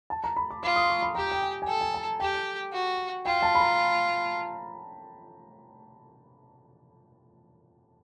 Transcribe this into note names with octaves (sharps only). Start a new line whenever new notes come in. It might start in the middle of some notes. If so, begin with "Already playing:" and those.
A5
A#5
B5
D6
F4 D6
D#6
C6
C#6
B5
G4 A#5
G5
G#5
G#5
A4 G5
G#5
A5
G4 G5
F#4
F4 G5
A5
B5
A#5